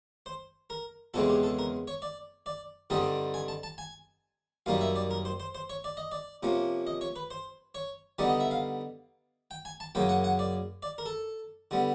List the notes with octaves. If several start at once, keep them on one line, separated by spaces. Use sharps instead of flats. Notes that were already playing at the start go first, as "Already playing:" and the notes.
C5
A#4
E2 C#3 E3 G#3 C4 A4
G4
A4
A#4
C#5
D5
D5
G2 D3 G3 C4 D#4 D#5
G#5
A5
A5
G#5
F#2 D#3 G3 A#3 D#4 F5
E5
D5
A#4
C5
C5
C5
C#5
D5
D#5
D5
C3 F3 A#3 C#4
D#5
C#5
B4
C5
C#5
D3 G3 B3 D#4 D5
D#5
E5
F5
G5
G#5
A5
F#2 C#3 F#3 A#3 G5
F#5
F#5
D5
D5
A#4
A4
D3 G3 B3